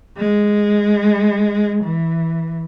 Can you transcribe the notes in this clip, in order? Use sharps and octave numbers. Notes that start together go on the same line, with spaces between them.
G#3
E3